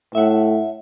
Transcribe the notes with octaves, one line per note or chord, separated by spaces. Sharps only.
A2 E5 F#5